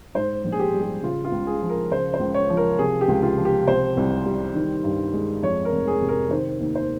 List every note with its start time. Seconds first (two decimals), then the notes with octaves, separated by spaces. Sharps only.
0.15 G#2 C5
0.44 A#1
0.52 G#4
0.59 G4
0.74 G3
0.82 G4
1.03 C#3 F4
1.25 F4
1.32 C#2
1.47 G#4
1.62 F3
1.69 A#4
1.91 C#3 C5
2.14 C5
2.20 C#2
2.34 C#5
2.50 F3
2.57 A#4
2.79 C3 G#4
3.01 G4
3.08 C#2
3.23 F4
3.38 F3
3.45 G4
3.67 C3 C5
3.97 C2
4.26 G3
4.54 D#3
4.84 G2
5.14 G#3
5.42 F2 C#5
5.65 A#4
5.72 F1
5.87 G#4
6.02 C3
6.09 A#4
6.31 D#3 C5
6.60 D#2
6.75 C5